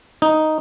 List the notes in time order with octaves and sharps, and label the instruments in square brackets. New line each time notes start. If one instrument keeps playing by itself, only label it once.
[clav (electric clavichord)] D#4